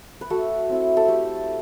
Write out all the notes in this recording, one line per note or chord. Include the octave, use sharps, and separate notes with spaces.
B4
A3 F#4 A4
C4 E4
A4
A3 G4